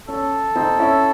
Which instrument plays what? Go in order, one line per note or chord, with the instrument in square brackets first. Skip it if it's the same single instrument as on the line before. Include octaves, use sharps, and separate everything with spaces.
[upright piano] C#4 [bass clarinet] A4
[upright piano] C4 D#4
C#4 E4